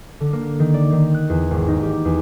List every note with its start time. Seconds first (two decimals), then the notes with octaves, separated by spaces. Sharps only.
0.20 D3
0.33 A#3
0.60 D#3
0.74 D5
0.92 D#3
1.14 F#6
1.30 E2
1.51 G#1
1.68 D#4
1.83 G4
2.05 E2